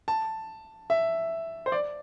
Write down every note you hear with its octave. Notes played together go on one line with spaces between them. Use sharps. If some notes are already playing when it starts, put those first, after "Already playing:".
A5
E5
C5
D5